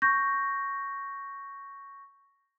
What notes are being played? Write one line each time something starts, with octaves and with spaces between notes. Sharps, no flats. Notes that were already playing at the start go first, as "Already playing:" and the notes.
C#6 G6 A#6